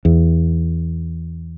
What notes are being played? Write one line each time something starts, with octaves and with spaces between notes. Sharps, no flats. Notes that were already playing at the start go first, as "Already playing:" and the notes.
E2